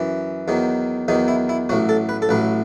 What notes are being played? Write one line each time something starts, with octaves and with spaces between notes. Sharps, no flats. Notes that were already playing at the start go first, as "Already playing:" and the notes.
Already playing: F#2 E3
E2 D#3 F#3
E2 D#3 F#3 D#4
E4
E4
A1 A2 F#3 F#4
A4
B4
A4
A1 A2 F#3 B4